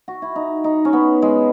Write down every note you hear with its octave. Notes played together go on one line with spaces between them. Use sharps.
F#4
E4
D#4
D#4
C#4
B3
G#3